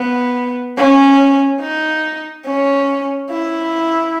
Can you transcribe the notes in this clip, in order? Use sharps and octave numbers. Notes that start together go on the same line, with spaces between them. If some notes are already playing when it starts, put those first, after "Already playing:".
Already playing: B3
C#4
D#4
C#4
E4